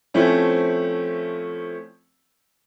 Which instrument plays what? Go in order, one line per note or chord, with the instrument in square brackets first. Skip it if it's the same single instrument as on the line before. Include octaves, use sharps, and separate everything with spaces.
[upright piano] F3 A3 C4 C#4 E4